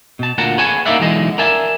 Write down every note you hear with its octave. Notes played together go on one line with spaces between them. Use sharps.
B2 A5
D2 A#2 F#5 A5 A#5
G#4 B4 C#5 F#5 G#5 A5
A#3 D#4 E4 D5 E5 F#5
B1 D3 E3 G#3 D#5
A#4 D5 E5 G#5 A5